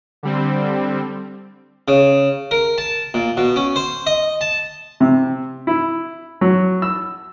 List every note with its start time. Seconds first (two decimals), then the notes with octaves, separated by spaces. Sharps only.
0.23 D3 G3 C4
1.88 C#3
2.51 A#4
2.78 A5
3.14 A#2
3.37 B2
3.56 C#4
3.76 C5
4.06 D#5
4.41 A5
5.00 C3
5.67 E4
6.41 F#3
6.82 E6